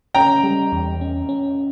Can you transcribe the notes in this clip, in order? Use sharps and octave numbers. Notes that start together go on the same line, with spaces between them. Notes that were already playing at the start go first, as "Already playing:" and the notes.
C#4 G5 A#5
G3
E2
C#4
C#4